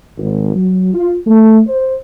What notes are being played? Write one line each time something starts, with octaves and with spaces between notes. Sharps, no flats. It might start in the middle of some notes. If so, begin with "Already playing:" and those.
G#1
F#3
F4
A3
C5